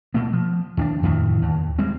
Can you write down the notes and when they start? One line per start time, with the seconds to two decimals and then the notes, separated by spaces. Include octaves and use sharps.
0.14 B2 A3 A#3
0.33 F3
0.77 D#2 C#4 D4
1.03 F2 A2 D#3 E3
1.42 D#2
1.79 G3 G#3 C4